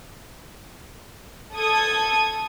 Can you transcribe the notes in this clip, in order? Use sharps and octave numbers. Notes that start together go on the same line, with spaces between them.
A4 D#6 G#6